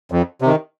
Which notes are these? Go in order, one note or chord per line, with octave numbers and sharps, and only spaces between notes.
F2
C3 D#3